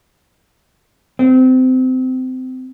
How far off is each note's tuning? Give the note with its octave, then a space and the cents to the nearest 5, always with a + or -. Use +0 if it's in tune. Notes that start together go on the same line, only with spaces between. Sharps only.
C4 -25